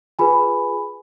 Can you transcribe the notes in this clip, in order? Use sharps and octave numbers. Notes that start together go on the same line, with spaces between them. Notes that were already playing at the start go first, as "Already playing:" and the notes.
F4 G#4 B4 G#5 B5